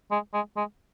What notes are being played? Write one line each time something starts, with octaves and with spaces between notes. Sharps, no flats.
G#3
G#3
G#3